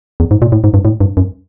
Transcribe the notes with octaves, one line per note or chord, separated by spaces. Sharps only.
E2
G#2
A#2
A2
G#2
G2
A2
G2
F#2